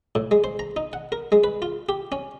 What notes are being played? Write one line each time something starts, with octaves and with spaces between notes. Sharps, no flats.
A2
G#3
C5
A#5
D#4
F#5
A#4
G#3
B4
F4
G4
C#4